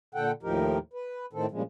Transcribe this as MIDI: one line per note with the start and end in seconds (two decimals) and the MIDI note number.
0.15 0.32 46
0.15 0.32 50
0.15 0.32 69
0.15 0.32 78
0.15 0.32 79
0.43 0.78 39
0.43 0.78 45
0.43 0.78 53
0.43 0.78 63
0.43 0.78 67
0.43 0.78 70
0.93 1.26 71
1.33 1.46 45
1.33 1.46 51
1.33 1.46 60
1.33 1.46 69
1.51 1.62 43
1.51 1.62 46
1.51 1.62 49
1.51 1.62 53
1.51 1.62 56